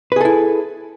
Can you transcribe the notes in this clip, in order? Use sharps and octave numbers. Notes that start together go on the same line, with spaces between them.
E4 G#4 A4 B4